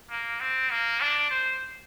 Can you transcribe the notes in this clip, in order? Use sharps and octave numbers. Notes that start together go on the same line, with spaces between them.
A#3
C4
A#3
D4
C5